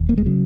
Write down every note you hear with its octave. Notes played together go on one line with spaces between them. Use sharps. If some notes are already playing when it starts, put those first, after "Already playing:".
Already playing: E1 D#2
A#3
G#3
C#3 F#3